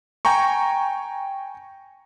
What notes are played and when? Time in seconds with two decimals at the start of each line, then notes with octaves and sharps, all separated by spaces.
0.25 G5 G#5 A#5 C#6